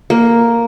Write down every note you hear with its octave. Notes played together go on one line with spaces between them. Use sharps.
A#3